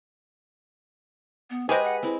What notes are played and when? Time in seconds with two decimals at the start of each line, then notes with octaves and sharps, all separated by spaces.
1.50 B3
1.69 G#3 G4 G#4 B4 C5 D#5
1.84 F#5
2.03 C4 E4